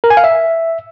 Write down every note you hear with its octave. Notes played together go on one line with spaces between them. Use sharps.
A#4
G#5
F5
E5